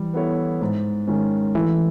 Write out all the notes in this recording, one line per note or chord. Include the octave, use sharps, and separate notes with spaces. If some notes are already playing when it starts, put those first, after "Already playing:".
Already playing: E3 G3
B3 E4 A4 C#5
G#2
D#3 G#3 C#4
E3 A3